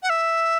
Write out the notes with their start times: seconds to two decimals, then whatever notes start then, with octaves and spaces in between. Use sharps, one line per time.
0.03 F#5
0.10 E5